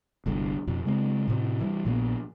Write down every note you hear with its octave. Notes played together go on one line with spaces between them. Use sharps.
G1 C2 D3 D4
F2 B2
C#3 G#3 A3 C4
A2 C3
E3 G3
A#1 A#2 A#3 B3